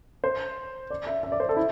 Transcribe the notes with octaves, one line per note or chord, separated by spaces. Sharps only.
C5
D5
E5
E5
D5
C5
A4
E4